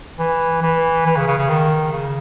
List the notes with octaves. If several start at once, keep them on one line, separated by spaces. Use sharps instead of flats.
E3
E3
E3
C#3
C#3
C#3
D#3
C#3